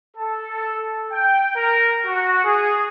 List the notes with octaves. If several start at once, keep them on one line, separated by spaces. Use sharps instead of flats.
A4
G5
A#4
F#4
G#4